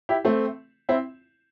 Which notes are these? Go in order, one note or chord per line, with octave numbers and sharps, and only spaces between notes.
E4 G4
A3 C4
C4 E4